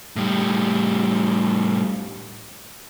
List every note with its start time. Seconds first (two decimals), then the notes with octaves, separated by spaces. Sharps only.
0.16 A2 G3